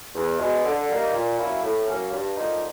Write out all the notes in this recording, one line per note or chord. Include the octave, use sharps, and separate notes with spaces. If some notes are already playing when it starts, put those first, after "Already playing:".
E2
B2 G#3
D3
G3 A#3 D#4
A#2
F#3 A#3 C#4 E4
A2
F#3 A#3 C#4
G2
D3 F3 A#3 D#4